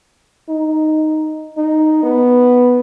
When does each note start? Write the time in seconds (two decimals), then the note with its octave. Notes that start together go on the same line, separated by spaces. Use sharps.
0.49 D#4
1.57 D#4
2.03 B3